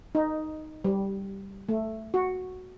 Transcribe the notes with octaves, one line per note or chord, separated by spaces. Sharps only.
D#4
G3
A3
F#4